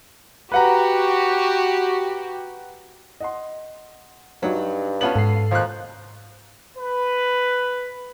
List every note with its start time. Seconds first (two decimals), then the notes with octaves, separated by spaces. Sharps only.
0.52 F#4 G4 B4 F#5 A#5
3.20 D#5 F#5 C6
4.43 G2 F#3 D4 D#4
5.01 B3 C#4 F4 A5 B5 F#7
5.15 G#2 A4 F5 C7
5.51 D#2 F3 F#6
6.77 B4